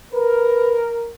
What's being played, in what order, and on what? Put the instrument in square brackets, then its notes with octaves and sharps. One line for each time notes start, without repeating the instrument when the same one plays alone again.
[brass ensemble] A#4 [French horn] B4